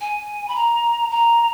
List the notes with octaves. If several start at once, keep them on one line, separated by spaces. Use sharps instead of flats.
G#5
B5
A#5
A#5